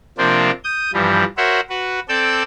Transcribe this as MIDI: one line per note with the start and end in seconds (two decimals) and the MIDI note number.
0.18 0.51 48
0.18 0.51 53
0.18 0.51 58
0.18 0.51 60
0.18 0.51 62
0.18 0.51 65
0.64 0.91 87
0.64 0.91 91
0.93 1.24 43
0.93 1.24 52
0.93 1.24 53
0.93 1.24 55
1.37 1.60 66
1.37 1.60 70
1.37 1.60 72
1.37 1.60 73
1.37 1.60 76
1.37 1.60 78
1.69 2.00 66
1.69 2.00 71
2.09 2.43 60
2.09 2.43 69
2.09 2.43 74
2.09 2.43 88
2.09 2.43 91